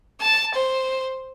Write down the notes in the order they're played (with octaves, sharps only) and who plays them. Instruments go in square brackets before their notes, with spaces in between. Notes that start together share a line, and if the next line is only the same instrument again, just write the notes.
[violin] A5
C5